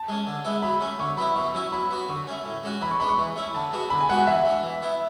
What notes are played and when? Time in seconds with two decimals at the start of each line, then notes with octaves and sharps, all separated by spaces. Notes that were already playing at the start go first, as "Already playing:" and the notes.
Already playing: A5
0.08 G#3 C#4
0.27 D3
0.45 G#3 B3 E4
0.62 F#3 B5
0.81 A3 C#4
0.99 D3 C#6
1.17 F#3 B3 E4 B5
1.36 B2 C#6
1.54 F#3 C#4 E4
1.72 F#3 B5
1.91 B3 F#4
2.09 D3 C#6
2.27 A3 C#4
2.45 A2
2.63 G#3 C#4 F#4
2.81 E3 B5
2.91 C#6
3.00 G#3 B3 D4 B5
3.09 C#6
3.19 E3
3.36 A3 C#4 E4
3.54 D3 A5
3.72 G#3 B3 F#4
3.90 D3 B5
4.01 G#5
4.09 G#3 B3 F#4 F#5
4.27 E3 E5
4.45 A3 D4
4.63 E3
4.82 B3 E4